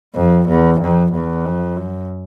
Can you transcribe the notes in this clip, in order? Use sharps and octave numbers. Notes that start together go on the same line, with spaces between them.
F2
E2
F2
E2
F2
F#2